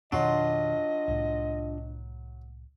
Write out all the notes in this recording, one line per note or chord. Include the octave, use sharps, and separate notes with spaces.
F2 B2 D#3 F#3 D4 F4 D#5 C6
C2 A2